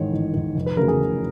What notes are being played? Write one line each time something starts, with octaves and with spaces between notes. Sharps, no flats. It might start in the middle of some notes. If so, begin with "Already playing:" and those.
Already playing: A1 G#2 D#3 C#5
A1
G#2 D#3
F1
B4
E2 C#3 F#3 A3 A#4
G#4
F1